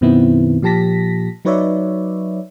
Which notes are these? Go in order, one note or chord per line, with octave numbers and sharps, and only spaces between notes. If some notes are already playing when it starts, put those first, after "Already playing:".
F#2 B2 D#3 B3 C4 E4
A#2 F3 G4 A5 A#6 B6
F#3 D#4 B4 C#5 D5 E5